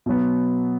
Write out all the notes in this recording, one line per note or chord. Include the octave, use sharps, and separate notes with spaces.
B2 F#3 B3